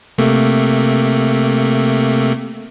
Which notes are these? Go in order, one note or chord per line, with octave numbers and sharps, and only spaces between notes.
C3 A3 A#3